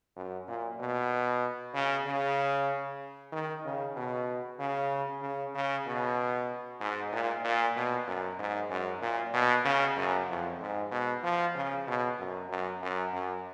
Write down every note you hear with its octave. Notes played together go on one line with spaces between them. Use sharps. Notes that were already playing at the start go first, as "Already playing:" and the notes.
F#2
A#2
B2
C#3
C#3
D#3
C#3
B2
C#3
C#3
C#3
B2
G#2
A#2
A#2
B2
F#2
G#2
F#2
A#2
B2
C#3
F#2
F2
G#2
B2
F3
C#3
B2
F#2
F#2
F#2
F#2